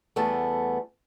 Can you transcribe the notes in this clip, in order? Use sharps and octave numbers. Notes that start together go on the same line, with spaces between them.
E2 G3 A3 B3 A5